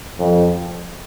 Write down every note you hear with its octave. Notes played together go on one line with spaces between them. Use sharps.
F2